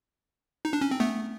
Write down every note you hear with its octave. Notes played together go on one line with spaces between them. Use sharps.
D#4
D4
C#4
C4
A3 B3